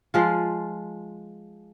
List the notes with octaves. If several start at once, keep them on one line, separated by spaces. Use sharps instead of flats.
F3 G#3 F4